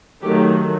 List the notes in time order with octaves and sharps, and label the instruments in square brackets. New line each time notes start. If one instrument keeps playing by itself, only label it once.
[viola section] D#3 F#3 A3 G4